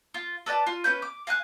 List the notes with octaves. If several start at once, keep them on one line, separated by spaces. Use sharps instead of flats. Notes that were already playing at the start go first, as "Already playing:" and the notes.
F4
A4 B4 D5 A5
F4
C#4 B4 G6
D6
F5 G#5 F#6